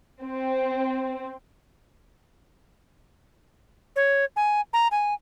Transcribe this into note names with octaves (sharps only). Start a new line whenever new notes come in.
C4
C#5
G#5
A#5
G#5